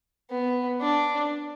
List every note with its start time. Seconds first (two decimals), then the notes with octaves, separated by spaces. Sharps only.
0.30 B3
0.81 D4